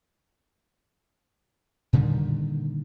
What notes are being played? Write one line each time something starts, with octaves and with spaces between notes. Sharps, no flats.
A#2 D3 D#3 G3